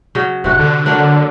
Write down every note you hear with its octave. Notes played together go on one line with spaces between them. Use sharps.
C#3 F#3 D#5
D1 C3 F#4
D3
F#3 A#3 D4